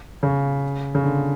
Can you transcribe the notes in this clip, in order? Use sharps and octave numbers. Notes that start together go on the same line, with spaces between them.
C#3
C#3
D3